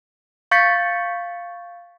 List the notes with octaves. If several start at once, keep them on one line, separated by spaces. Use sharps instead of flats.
F5 C#6 G6 A6 B6 C#7